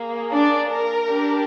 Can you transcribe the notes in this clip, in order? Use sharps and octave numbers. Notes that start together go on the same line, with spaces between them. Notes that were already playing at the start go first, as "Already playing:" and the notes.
Already playing: A#3 G#4
D4 D5
A#4
D4 G4